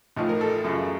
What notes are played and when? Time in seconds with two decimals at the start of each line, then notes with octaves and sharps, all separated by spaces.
0.16 A1 A2 F3 D#4
0.29 A#4
0.41 A4
0.64 F#2 C#3 F3